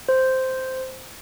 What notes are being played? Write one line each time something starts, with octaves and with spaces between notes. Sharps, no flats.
C5